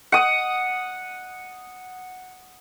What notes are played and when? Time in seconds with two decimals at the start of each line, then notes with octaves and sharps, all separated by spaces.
0.12 F#5 D#6